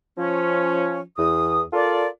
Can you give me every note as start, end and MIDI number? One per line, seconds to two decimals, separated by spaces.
0.17 1.00 53
0.17 1.00 61
1.17 1.61 40
1.17 1.61 87
1.73 2.06 65
1.73 2.06 69
1.73 2.06 70
1.73 2.06 74